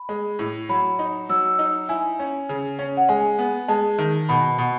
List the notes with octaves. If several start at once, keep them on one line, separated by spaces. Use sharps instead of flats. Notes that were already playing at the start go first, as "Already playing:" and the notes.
Already playing: B5
G#3
A2
F#3 B5
D#4
F#3 E6
D#4
E4 G#5
C#4
C#3
C#4
F#5
G#3 G#5
B3
G#3 A5
D#3
B2 B5
B2